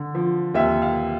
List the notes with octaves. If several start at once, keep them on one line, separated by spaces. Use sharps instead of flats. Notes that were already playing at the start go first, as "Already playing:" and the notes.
Already playing: D3
F3
D#2 E5
F5